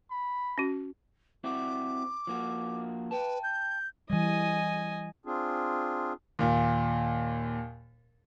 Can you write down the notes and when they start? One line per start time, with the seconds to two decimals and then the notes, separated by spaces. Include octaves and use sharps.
0.11 B5
0.58 C#4 F#4
1.44 C4 E4 F#4 D6
2.27 F3 A#3 F#4
3.11 B4 G5 A5
3.43 G6
4.10 E3 G3 D#5 G#5
5.26 C4 D4 F4 G#4
6.39 D#2 A#2